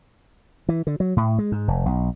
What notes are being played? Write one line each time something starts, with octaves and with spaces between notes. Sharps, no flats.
E3
D3
F#3
A2
G#3
G#2
F1
B1